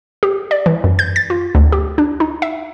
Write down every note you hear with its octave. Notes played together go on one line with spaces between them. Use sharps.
G4
D5
E3
F#2
G6
A6
F4
D2
G4
D4
D#4
E5